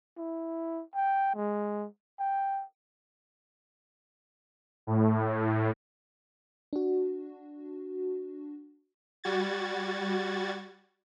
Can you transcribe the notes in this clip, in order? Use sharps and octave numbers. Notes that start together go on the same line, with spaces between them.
E4
G5
G#3
G5
A2
D4 F#4
G3 F#4 G#6 A6